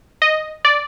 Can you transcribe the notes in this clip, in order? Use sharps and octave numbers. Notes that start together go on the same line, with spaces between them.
D#5
D5